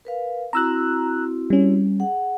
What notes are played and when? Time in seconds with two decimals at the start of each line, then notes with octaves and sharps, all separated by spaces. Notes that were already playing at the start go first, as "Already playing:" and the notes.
0.05 A#4 B4 F5
0.53 C4 E4 F#4 A#5 E6 F#6
1.50 G3 C#4
2.00 G#4 F#5